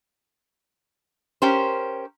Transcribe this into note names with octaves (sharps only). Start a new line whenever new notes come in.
C#4 G4 A#4 C5